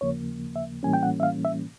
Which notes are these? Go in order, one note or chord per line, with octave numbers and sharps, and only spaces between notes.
D#2 C#3 F3 A#3 C#5
E5
A2 E3 G3 A#3 C#4 G#5
G5
F#5
E5
F5
E5